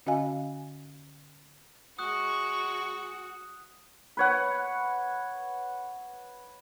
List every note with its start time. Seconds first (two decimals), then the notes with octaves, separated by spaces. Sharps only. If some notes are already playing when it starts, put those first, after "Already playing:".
0.06 D3 C#4 F#4 D#5 F5 G#5
1.99 G#3 F#4 C#6 D#6 F#6
4.17 B4 C#5 F#5